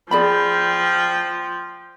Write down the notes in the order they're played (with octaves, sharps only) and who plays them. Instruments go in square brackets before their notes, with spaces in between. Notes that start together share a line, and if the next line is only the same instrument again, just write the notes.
[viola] F3 G5 [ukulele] G#4 D5 B5